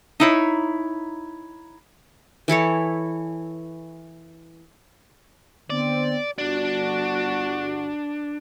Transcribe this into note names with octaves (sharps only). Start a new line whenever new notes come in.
D#4 E4 C#5
E3 E4 A4 C#5
D3 B3 C4 D5
G1 D4 F#4